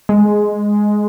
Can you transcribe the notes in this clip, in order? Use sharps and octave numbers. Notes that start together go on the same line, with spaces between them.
G#3